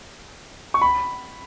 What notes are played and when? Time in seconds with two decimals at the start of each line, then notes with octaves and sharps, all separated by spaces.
0.74 C#6
0.82 B5